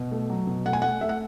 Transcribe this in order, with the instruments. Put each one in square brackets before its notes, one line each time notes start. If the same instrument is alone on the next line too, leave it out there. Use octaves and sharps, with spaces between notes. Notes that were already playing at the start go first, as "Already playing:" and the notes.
Already playing: [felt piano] B2
A3
F#3
B2
A3 F#5
G#5
A3 F#5
A3 E5
F#5